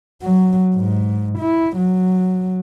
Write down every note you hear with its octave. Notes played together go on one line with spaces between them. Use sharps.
F#3
G#2
E4
F#3